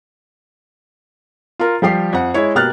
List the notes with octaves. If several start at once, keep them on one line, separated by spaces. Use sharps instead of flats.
F4 A#4
F3 G3 G4 C7
F2 F#5
G#3 E4 C#5
B2 A#3 G4 F6 F#6 A6